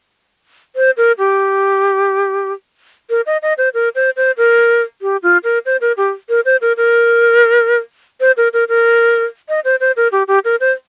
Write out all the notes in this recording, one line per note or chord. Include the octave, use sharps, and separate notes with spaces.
C5
A#4
G4
A#4
D#5
D#5
C5
A#4
C5
C5
A#4
G4
F4
A#4
C5
A#4
G4
A#4
C5
A#4
A#4
C5
A#4
A#4
A#4
D#5
C5
C5
A#4
G4
G4
A#4
C5